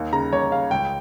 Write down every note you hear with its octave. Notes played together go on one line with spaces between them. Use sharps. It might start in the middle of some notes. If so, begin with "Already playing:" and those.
Already playing: D#2
C#3 A#5
D#2 C#5
C#3 F5
C#2 G5